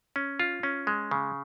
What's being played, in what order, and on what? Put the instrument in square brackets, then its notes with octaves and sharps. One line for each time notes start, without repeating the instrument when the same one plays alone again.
[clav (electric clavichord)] C#4
F4
C#4
G#3
C#3